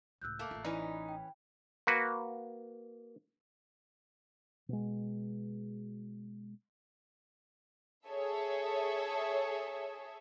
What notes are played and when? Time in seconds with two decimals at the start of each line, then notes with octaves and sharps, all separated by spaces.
0.22 C#2 A2 E6 F#6 G6
0.39 A3 A#3
0.51 A1 F4
0.65 E3 C#4 D#4 E4 B4 D5
1.09 G5
1.87 A#3 F#4 B4
4.69 B2 G#3
8.08 G#4 A4 C#5 E5